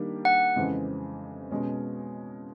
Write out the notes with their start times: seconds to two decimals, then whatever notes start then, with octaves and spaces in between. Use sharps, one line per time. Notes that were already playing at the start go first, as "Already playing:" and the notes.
Already playing: D#3 G3 A#3 D4 G4
0.25 F#5
0.56 F2 C#3 E3 G#3 C4
1.51 B2 G#3 C#4